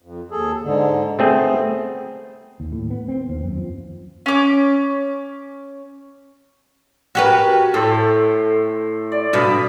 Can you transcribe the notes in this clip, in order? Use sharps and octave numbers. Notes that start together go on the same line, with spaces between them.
F2
D#2 G#4 A4
G#2 D3
A3 B3 C4 G#4
D#2
A2
B3
C4
D#2
F#2
F3
C#4 D6
C#4 F#4 G4 A#4 B4
A2 A4 C5
D5
G2 B2 F5 B5 D#6